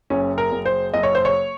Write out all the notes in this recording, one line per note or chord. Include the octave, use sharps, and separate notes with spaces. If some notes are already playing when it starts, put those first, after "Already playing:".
F#1 C#4
A#4
F#1
C5
F#1 D#5
C#5
C5
C#5